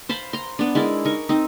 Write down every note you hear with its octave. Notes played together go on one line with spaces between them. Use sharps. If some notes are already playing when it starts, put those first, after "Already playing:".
C5 F5 A5 B5
A#5 C6
B3 D4
G#3 E4 A#4 D5
D#4 A#4 C#6
C4 D#4